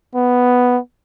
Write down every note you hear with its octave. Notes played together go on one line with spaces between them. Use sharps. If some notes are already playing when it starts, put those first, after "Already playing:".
B3